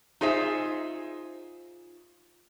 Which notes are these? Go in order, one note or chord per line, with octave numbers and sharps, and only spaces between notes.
D#4 F4 G#4 C5 E5